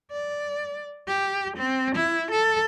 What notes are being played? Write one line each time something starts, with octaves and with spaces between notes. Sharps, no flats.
D5
G4
C4
E4
A4